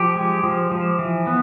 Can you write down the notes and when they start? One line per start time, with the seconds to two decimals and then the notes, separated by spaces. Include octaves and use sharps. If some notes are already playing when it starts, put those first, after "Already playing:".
Already playing: F3 G4
0.16 G#3
0.44 F3
0.71 F3
0.99 E3
1.27 B3